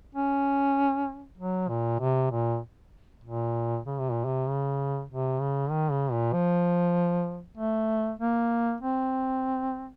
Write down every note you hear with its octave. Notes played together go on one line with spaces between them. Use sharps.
C#4
F#3
A#2
C3
A#2
A#2
C#3
C3
A#2
C3
C#3
C3
C#3
D#3
C#3
A#2
F3
A3
A#3
C4